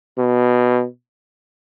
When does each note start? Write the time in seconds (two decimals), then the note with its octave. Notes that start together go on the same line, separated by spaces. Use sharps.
0.18 B2